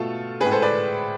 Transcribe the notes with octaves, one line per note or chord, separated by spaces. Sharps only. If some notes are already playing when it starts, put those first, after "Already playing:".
Already playing: B2 A3 F4 A4
A2 G#3 G#4 B4
A4 C5
B4 D5